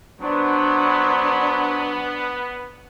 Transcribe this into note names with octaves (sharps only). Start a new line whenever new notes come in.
F#3 B3 D4 C5